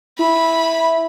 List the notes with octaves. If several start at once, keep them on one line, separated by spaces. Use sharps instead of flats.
E4 B5